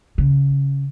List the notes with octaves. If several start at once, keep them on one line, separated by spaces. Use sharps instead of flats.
C#3